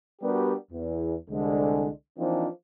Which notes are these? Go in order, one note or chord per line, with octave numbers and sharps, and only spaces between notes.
G3 B3 D4 F#4 G4 A#4
E2
C2 D3 G#3
E3 F3 A#3 C4 D4 D#4